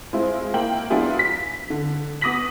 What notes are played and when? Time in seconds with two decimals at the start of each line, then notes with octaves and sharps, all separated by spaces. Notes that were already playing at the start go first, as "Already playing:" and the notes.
0.13 G#3 C4 E4 F4
0.54 A#3 E4 G5 F#7
0.90 F#3 B3 D4 E4 F4 G#4
1.19 B6
1.70 D3
2.21 B3 D6 D#6 A#6 B6 F#7